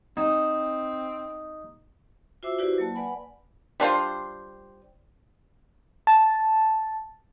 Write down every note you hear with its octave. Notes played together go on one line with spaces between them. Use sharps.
C4 D#4
F4 F#4 C5 E5 D6 E6
E4 F#4 G4 B4 C5 D5
F#3 A#3 A5
B4 D5 F#5 G#5 B5
G3 D4 F4 C5
A5